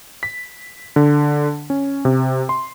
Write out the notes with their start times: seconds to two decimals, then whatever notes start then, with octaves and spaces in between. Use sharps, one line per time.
0.23 B6
0.96 D3
1.70 C#4
2.05 C3
2.49 C6